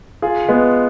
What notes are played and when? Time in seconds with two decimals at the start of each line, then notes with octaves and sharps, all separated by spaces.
0.22 F4 G#4
0.48 G#3 B3